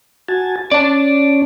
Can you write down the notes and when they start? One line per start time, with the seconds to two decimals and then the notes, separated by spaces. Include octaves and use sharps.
0.28 F#4 G#5 A5
0.71 C#4 D5 A5